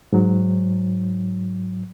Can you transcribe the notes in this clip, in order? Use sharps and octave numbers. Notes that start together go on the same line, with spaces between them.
G#2 F#3